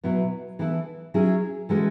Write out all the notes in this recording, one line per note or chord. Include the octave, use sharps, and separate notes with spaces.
B2 F#3 B3 E4
E3 B3 E4 A4
F#3 C#4 E4 G#4
E3 G#3 C#4 F#4 A4